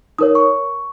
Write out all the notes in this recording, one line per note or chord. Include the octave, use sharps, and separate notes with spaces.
D#4 A#4 C#5 D#6
C#6